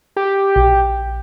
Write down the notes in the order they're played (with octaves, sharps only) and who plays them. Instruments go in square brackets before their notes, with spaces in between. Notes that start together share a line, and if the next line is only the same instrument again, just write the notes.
[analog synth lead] G4
[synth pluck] A#1